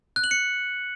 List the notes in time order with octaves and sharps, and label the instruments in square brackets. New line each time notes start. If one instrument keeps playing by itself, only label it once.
[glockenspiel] F#6
F#7
C#7